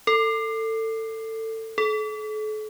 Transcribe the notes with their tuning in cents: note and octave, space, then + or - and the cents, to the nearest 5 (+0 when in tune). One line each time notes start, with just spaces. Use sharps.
A4 +25
A4 -40